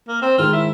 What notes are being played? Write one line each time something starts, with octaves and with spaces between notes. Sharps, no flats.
A#3
C4
G#2 D#3 G#3 F4
E4